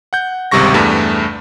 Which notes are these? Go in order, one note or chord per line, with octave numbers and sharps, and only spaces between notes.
F#5 G6
G#1 C#2 C3 G3 C#6 A#6
E2 G2 A3